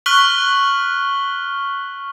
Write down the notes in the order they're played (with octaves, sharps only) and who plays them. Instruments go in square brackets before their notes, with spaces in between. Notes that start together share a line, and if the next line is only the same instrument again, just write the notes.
[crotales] C#6 F6 F#6 B6 F#7 G7